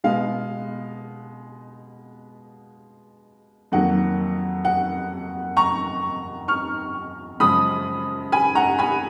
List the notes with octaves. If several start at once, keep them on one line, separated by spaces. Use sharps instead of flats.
B2 G#3 B3 F5
F2 D#3 F#3 A#3 F#5
F#5
A#5 C#6
C#6 F6
F#2 C#3 F3 G#3 B5 D#6
G#5 B5
F#5 A#5
G#5 B5